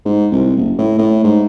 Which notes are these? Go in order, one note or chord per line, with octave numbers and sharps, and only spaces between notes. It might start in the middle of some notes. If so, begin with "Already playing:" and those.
G#2
C2
F#1
A2
A2
G#2